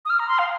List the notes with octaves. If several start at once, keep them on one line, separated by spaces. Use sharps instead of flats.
D#6
F6
A#5
C6
F5